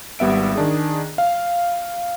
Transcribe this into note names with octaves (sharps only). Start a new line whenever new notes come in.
G#1 G3 B3 E5 D7
D#3 D4 G#4
F5